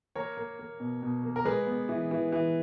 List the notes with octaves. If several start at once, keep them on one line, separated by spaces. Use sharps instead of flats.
A#3 A#4 C#5
A#3
A#3
B2
B2
A#3
A#4
G#3 G#4 B4
B3
E3
E3
E3